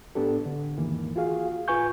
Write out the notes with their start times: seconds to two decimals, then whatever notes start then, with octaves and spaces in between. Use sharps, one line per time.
0.15 A2 B3 D4 G4 A4
0.46 D3
0.77 E2 G#2 D#3 E3 A#3
1.16 F4 F#4 G#4 F5
1.68 A2 F4 B4 G#5 C#6 G6